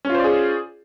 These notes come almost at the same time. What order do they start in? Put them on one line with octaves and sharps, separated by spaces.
C#4 F4 C5 D5 G#4